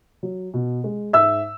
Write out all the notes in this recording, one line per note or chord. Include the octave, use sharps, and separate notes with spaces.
F#3
B2
G#3
G#2 E5 E6